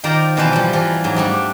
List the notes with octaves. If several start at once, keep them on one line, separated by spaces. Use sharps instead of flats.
D#3 F4 A#4 C5 D5 A#5
B2 E3 A#3 B4 C5 A5
F3 G3
E3 F3 F4
G#2 F#3
G3 A3 D4